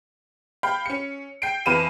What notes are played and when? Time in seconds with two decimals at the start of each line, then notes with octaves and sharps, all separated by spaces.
0.63 F5 G5 B5
0.86 C#4 C#7
1.42 G5 C7 D7
1.66 F2 E3 F5 B5 D#7 E7